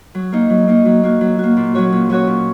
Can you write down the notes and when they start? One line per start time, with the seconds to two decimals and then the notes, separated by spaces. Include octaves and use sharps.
0.15 F#3
0.32 A#3 D#4
0.50 F#3
0.68 A#3 D#4
0.85 F#3
1.03 A#3 F#4
1.21 F#3
1.39 A#3 F#4
1.57 A#2
1.75 F#3 C#4 F#4 C#5
1.93 A#2
2.10 F#3 C#4 F#4 C#5
2.27 A#2